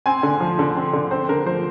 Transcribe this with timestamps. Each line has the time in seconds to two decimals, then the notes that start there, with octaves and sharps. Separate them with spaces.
0.06 C4 G#5
0.23 D3
0.40 F3
0.59 D3
0.77 C4
0.93 D3
1.11 C4 C5
1.29 D3 A#4
1.46 F3 C5